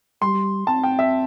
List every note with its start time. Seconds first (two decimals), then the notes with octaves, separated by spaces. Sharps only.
0.22 G3 C6
0.67 C4 A5
0.83 G5
0.99 E5